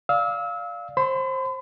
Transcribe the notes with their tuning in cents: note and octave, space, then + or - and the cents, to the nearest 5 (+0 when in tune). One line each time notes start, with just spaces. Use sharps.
D5 +0 F5 +0 E6 -30
C5 +20 B5 +45